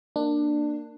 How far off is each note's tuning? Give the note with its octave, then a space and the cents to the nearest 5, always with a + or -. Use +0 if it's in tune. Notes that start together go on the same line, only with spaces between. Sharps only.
A#3 -5 D4 +15